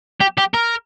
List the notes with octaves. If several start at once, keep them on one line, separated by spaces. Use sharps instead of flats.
G4
G4
A#4